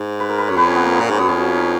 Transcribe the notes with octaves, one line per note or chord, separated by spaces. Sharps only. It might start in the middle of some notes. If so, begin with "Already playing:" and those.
Already playing: G#2
B4
A#4
B4
F#2 C#5
F2 B4
C#4
B3
A#3
B3
A#2 C#4
G#2
F#2 B3
F2 C#4
F#4
F4
D#4